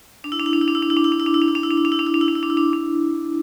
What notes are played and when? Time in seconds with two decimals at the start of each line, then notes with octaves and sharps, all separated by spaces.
0.24 D4
0.32 E4
0.40 D4
0.46 E4
0.53 D4
0.61 E4
0.68 D4
0.75 E4
0.83 D4
0.90 E4
0.97 D4
1.04 E4
1.12 D4
1.20 E4
1.26 D4
1.34 E4
1.42 D4
1.48 E4
1.55 D4
1.63 E4
1.71 D4
1.77 E4
1.85 D4
1.92 E4
1.99 D4
2.07 E4
2.14 D4
2.21 E4
2.28 D4
2.35 E4
2.43 D4
2.50 E4
2.57 D4
2.73 D4